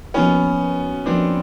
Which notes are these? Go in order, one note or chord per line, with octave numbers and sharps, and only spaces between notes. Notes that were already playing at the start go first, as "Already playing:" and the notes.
F3 A#3 B3 C#4 D#4 F#4 B4
F3 A#3 C4 D4 D#4 F#4 B4